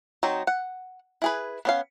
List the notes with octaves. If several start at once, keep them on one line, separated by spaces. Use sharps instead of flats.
F#3 C4 D#4
F#5
E4 G#4 B4
B3 C#4 F5